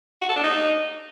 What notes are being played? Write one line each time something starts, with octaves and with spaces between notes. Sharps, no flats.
F#4
A4
D4
D#4